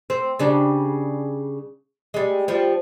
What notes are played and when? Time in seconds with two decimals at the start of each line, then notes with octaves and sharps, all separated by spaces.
0.10 C4
0.39 C#3 G3 D4
2.14 G3 G#3
2.48 F3 G3